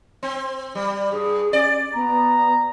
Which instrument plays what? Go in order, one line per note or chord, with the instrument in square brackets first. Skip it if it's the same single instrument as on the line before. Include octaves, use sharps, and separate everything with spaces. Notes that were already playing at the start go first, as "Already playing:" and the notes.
[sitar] C4
G3
[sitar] G2 [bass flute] G#4
[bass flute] C#4 [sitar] D5
[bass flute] B3 [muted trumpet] A#5